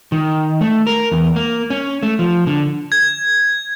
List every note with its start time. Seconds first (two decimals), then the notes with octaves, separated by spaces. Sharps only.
0.12 D#3
0.61 A3
0.87 A#4
1.12 E2
1.36 A#3
1.70 C#4
2.03 A3
2.19 F3
2.47 D3
2.92 G#6